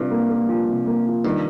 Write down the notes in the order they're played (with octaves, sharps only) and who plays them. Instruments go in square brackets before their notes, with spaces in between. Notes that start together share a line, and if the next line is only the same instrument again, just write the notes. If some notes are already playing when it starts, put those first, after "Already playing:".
Already playing: [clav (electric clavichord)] G2 [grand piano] C3 F3
[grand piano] A#3
A#3
F3
C3
A#3
F3
[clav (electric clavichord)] G2 [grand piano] D#3